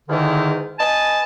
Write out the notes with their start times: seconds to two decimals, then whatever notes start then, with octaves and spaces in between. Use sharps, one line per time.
0.08 E2 G#2 D3 D#3
0.79 B4 D#5 G#5 A5